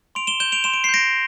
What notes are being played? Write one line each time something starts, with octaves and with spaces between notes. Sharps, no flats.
C6 D7 F7
E7 G7
G6 E7 G7
D7 F7
C6 E7
D7
C7
G6
A#6 D7